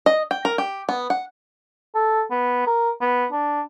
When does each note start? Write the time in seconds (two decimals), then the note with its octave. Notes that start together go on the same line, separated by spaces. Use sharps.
0.06 D#5
0.31 G5
0.45 A#4
0.58 G4
0.89 B3
1.10 F#5
1.95 A4
2.31 B3
2.67 A#4
3.01 B3
3.32 D4